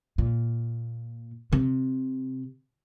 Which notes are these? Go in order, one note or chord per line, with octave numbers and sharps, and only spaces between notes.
A#2
C3